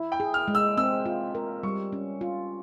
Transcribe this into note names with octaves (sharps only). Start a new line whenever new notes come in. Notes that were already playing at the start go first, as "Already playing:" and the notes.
Already playing: E4
G5
G#4
F6
G#3
E6
C4 E6
F4
A#4
G3 C#6
C#4
F4